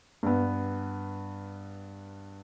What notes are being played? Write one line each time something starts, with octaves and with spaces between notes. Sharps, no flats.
G2 B3